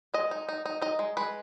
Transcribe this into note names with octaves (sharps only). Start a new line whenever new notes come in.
G#3 D#5
D#4
D#4
D#4
D#4 D#5
G#3
G#3 B4